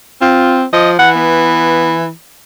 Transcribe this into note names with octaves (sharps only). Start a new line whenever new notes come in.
C4 F4
F3 D#5
E3 F#5
B3